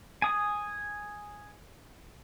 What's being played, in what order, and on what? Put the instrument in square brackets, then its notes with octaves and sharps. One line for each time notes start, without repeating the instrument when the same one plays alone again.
[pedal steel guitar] G#5 D#6